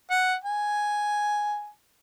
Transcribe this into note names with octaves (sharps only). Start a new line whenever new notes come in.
F#5
G#5